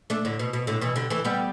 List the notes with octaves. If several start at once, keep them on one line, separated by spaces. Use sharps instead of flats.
A3 D4
A2 D3
B2
B2
A2 D3
B2 E3
D3 G3
E3 A3
G3 B3